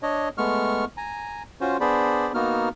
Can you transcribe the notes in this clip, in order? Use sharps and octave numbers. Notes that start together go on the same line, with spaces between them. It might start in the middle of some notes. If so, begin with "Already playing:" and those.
D4 C#5 D#5
G#3 A3 B3 C#6 F6
G#5 A#5
C#4 F4 F#4 C5
B3 D4 G#4 C5 D5 B5
A#3 B3 D#4 F#4 F6